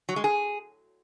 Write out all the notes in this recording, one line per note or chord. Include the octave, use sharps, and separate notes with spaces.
F#3
G#3
G#4